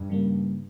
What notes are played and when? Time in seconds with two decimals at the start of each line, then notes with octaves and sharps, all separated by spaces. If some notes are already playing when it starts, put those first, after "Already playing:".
Already playing: G2
0.10 C#3 G3 A#3